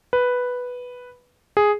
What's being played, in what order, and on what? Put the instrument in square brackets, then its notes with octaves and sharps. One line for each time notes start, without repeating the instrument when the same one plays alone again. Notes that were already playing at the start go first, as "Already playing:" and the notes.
[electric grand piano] B4
G#4